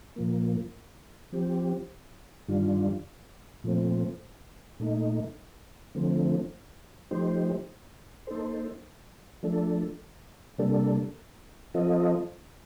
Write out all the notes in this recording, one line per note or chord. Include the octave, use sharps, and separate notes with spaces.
A#2 F3 A#3
F3 C4 G4
G2 D#3 G3 D4 F4
A#2 F3 A3 C4
A#2 A3 D#4
D3 F3 A3 C4
F3 A3 D#4 G4 C5
A#3 D#4 A4 C5
F3 A3 D4 A4
C3 G3 A#3 D4 A4
F3 C4 F4 A4 D#5